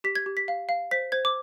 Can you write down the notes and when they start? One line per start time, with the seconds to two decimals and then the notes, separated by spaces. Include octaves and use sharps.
0.04 G4 B6
0.15 G#6
0.26 G4
0.37 B6
0.48 F5
0.69 F5
0.91 C5 B6
1.12 C5 G#6
1.25 D6